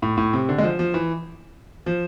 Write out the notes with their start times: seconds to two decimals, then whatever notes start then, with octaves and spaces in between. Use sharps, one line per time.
0.02 A2
0.17 A2
0.33 C3
0.49 D3
0.58 G#3
0.63 F3
0.79 F3
0.94 E3
1.86 F3